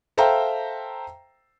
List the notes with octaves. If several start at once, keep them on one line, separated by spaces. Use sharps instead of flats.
A4 C5 E5 F5 G5 A#5